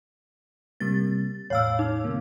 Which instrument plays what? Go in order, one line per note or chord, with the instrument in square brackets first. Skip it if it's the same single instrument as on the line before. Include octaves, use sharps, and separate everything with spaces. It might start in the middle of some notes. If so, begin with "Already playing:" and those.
[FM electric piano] C3 G3 A#3 [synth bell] A6
[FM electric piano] E2 A2 F5 [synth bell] C#5 E6
[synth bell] D#4
[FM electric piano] C3 D#3 A#3